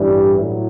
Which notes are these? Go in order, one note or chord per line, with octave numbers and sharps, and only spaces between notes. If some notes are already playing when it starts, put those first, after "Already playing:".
Already playing: A1 G2 E3 G3
A2 F#3